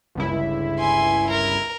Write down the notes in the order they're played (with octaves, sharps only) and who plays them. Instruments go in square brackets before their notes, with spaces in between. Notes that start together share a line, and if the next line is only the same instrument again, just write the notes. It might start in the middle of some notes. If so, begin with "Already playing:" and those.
[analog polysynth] G1 C#2 E4
[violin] G#5 C6
A#4